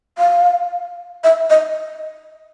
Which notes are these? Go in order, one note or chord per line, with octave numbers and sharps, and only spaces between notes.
F5
E5
D#5